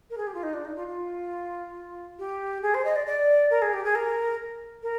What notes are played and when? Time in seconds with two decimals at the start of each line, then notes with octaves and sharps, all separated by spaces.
0.10 A#4
0.17 G#4
0.27 G4
0.34 F4
0.43 D#4
0.53 D4
0.65 D#4
0.75 F4
0.87 F4
2.19 G4
2.62 G#4
2.74 C5
2.85 D#5
2.95 D5
3.06 D5
3.50 A#4
3.61 G#4
3.73 G4
3.84 G#4
3.95 A#4
4.82 A#4